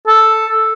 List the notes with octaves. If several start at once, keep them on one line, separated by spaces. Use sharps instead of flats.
A4